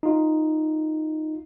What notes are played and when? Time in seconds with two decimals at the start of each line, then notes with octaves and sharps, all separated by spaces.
0.03 D#4 F4